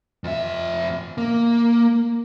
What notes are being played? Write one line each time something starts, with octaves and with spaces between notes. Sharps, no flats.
F2 E5
A#3